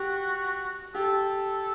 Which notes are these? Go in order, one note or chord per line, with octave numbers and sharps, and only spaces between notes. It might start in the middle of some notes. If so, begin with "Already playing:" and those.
Already playing: F#4 G4
G4 A4